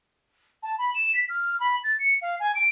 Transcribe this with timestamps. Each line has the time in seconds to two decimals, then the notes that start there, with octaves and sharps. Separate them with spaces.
0.63 A5
0.78 B5
0.95 E7
1.15 B6
1.29 F6
1.60 B5
1.84 A6
1.99 C#7
2.22 F5
2.40 G#5
2.55 D7